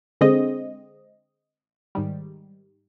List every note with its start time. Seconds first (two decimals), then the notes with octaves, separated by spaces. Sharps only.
0.21 D3 G#3 C4 D#5
1.95 G#2 D#3 G3